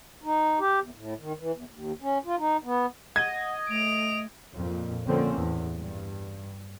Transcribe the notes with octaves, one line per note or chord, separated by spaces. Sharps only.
D#4
G4
E2
A2
D#3
E3
E2
D#2
C#4
F4
D#4
B3
D#5 F#5 G#6
A3 D7 F7
F2 A#2
D3 F3 A#3 C4 C#4
E2 A2
G2